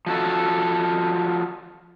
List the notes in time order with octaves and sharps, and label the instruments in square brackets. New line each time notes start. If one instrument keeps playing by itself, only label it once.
[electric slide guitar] F3 F#4 A4